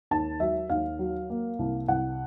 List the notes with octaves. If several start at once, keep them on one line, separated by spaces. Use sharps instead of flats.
D#2 A5
F#3 E5
D#2 F5
F#3
A#3
C2
C2 F#5